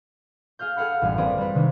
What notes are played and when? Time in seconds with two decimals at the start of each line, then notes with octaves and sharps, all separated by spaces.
0.59 G#4 F5 F6 G6
0.76 G#4 A4 F5 F#5 B5
1.02 A1 F#2 G3 F5 G#5
1.18 G3 C4 G#4 A#4 B4 D5
1.38 G3 B4
1.55 C3 D#3 G#3 C4 D4